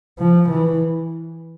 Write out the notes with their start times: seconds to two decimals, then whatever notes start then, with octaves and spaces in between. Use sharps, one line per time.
0.19 F3
0.49 E3